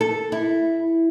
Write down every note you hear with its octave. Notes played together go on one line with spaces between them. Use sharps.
A4
E4